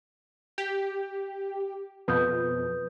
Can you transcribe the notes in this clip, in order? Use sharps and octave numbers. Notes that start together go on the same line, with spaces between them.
G4
F2 B2 B4 D#6 G6